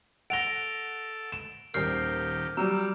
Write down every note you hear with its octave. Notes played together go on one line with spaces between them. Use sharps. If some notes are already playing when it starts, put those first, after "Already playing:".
A4 F#5 A#6 D7 F7 G7
E7
D#1 D#3 G4 A#4 F6 C7
F#3 G3 A#5 E6